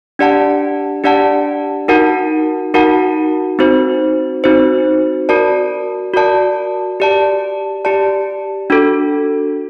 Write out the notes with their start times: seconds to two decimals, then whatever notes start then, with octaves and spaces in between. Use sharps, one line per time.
0.19 D4 G4 D5 F#5 A5
1.04 D4 G4 D5 F#5 A5
1.88 D#4 F#4 A#4 F#5 A5
2.74 D#4 F#4 A#4 F#5 A5
3.59 C4 D#4 F#4 C5
4.44 C4 D#4 F#4 C5
5.29 F#4 A#4 D5 A5
6.14 F#4 A#4 D5 A5
7.00 G4 D5 A5
7.85 G4 D5 A5
8.70 D4 F#4 A4